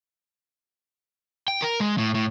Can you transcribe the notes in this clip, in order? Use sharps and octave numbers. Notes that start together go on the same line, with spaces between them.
G5
A#4
G#3
A2
A2